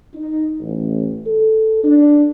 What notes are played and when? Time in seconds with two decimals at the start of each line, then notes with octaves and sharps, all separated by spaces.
0.14 D#4
0.60 A1
1.26 A4
1.84 D4